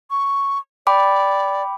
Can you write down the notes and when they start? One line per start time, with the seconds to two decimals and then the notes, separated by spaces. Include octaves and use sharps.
0.11 C#6
0.87 D5 G5 B5 D6